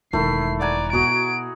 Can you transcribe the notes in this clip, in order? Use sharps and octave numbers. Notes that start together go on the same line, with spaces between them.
E1 D#3 A3 E4 C7
D5 F#5 G#5 A#5
B2 F#4 G#4 D7